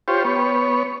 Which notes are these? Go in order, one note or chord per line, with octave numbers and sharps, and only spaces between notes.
F4 G4 C5 C#5
B3 C#5